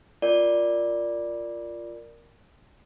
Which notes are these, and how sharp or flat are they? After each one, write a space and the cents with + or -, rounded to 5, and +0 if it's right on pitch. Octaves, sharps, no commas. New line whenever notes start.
F4 +0 A#4 +0 D5 +0